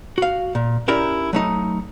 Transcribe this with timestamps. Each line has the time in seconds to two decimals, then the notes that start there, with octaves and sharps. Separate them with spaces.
0.18 F#4 F5
0.55 A#2
0.88 C#4 D#4 E4 G4 A#4 D5
1.33 F#3 A3 D#4